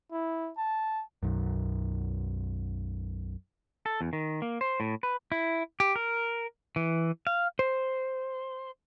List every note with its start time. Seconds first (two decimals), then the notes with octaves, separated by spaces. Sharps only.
0.12 E4
0.57 A5
1.23 B1 F#2
3.86 A4
4.01 E2
4.13 D#3
4.42 A#3
4.61 C5
4.80 A2
5.03 B4
5.32 E4
5.80 G4
5.96 A#4
6.76 E3
7.27 F5
7.59 C5